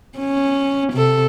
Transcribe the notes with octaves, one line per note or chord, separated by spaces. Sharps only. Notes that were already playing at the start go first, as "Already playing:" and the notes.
C#4
C3 A4